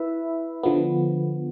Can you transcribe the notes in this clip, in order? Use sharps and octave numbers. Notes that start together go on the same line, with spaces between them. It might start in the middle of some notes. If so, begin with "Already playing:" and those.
Already playing: E4 B4 E5
D3 F3 B3